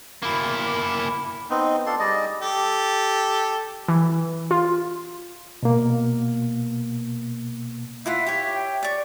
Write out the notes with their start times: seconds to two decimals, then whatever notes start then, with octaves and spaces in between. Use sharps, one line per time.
0.22 A#3 E4
1.50 B3 C4 D#4
1.86 D4 F4 A4 C6
1.99 G3 G#4 D5 D#5
2.42 G4 A4
3.88 E3
4.51 F4
5.63 B2 A#3
8.06 E4 F4 E5 F#5
8.27 G4 C#5
8.54 G5
8.83 D5 C#6 D6